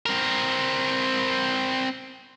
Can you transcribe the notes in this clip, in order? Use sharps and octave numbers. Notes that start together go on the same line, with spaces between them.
C4 A#4